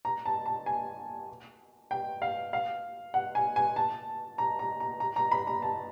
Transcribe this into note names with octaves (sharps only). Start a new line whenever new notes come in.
A#5
A5
A5
G#5
G5
F5
F5
F#5
G#5
G#5
A5
A#5
A#5
A#5
A#5
A#5
B5
A#5
A5